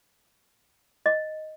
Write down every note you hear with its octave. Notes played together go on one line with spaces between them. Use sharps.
D#5